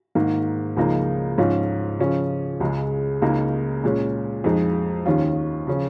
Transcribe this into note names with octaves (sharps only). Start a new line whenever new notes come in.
G#2 D#3 A#3
C#2 C#3 F3 A#3 D#4
G#2 F3 C#4 F4
C#3 F3 C#4 F4
C#2 C#3 G#3
C#2 C#3 A#3 D#4
A#2 G#3 C#4
F2 F3 G#3 D#4
D#2 D#3 C#4 F4
C#3 F3 C#4